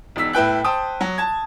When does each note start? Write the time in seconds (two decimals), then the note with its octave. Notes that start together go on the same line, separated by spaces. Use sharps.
0.16 E1 D#4 E6 B6
0.33 A2 E4 B4 G5 F#6
0.64 C5 G5 A5 D#6
1.01 F#3
1.18 A5 G#6